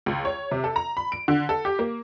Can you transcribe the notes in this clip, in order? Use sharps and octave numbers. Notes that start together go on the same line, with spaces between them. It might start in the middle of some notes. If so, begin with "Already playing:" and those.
C#2
C#5
C3
A4
A#5
B5
D7
D3
A4
G4
A#3